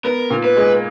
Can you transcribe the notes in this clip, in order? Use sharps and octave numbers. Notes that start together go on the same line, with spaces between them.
B3 A#4
A#2
B4
G#3